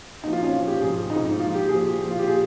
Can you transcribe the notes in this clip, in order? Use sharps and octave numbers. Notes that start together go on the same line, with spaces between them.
A#2 F3 D#4
F4
C#4
A#2 F3 F4
G4
G#2 F3 G#4
G#2 F3 D#4
D#4
A#2 F3 F4
G4
A#2 F3 G#4
A#2 F3
F4
G4
A#2 G#4